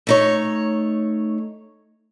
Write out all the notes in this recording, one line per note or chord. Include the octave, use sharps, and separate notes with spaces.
A3 D#4 C#5